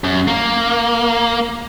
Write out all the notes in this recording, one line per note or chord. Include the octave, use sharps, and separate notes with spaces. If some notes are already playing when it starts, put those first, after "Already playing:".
F#2
A#3